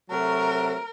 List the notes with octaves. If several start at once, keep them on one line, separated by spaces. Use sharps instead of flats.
C3 F#3 A3 A#4